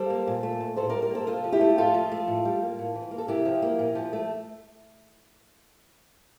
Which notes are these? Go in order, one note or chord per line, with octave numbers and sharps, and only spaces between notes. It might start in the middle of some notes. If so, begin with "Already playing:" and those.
Already playing: G3 A4 C5
A#3
A#2
A3
A#2
A2 A4 C5
G3 A#4 D5
A#4 D5
A#3 A4 C5
C3 F4 A4
F3
E4 G4
A3
A2 F4 A4
F3
A3
A2
G3
A#3
A2
E3
A#3
A4
C3 E4 G4
F3
A#3
A#2
F3
A3